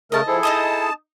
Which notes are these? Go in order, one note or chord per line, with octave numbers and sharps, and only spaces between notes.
C#3 A3 A#4 D#5 A5
F3 E4 G#4 A4
D#4 D#5 A5 D#6